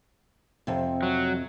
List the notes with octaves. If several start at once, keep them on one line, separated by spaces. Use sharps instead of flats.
F2 C3
F#3